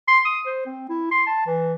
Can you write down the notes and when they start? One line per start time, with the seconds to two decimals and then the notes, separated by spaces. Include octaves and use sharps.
0.08 C6
0.25 D#6
0.46 C5
0.66 C4
0.89 E4
1.11 C6
1.26 A5
1.46 E3